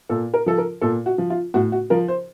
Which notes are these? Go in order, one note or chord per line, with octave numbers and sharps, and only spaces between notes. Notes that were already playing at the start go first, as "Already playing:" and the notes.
A#2 A4
A#4
F3 A4
A#4
A#2 A4
F#4
F3
F4
A2 F#4
F#4
F3 A#4
C5